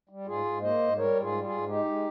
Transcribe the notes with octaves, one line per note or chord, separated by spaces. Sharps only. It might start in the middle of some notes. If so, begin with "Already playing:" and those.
G3
G#2 F4 G#4
G#2
A#3 C5 D#5
G#2
G3 A#4 C#5
G#2
F4 G#4
G3
F4 G#4
G#2
G#3 D#4 G4
G#3